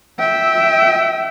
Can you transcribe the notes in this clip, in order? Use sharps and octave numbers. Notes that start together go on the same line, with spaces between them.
E5 G5